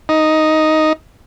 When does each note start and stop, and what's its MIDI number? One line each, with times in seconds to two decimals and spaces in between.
0.09 0.93 63